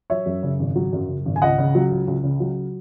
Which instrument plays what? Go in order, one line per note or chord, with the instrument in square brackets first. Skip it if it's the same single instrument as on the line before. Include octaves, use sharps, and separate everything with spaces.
[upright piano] F#3 C#5 E5
F#2
C#3
G#1
F#3
F#2
C#3
G#1
G#5
C#2 D#5 F#5
C#3
F#3
C#2
C#2
C#3
F#3